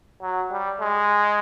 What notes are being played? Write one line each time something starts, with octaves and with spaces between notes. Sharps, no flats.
F#3
G3
G#3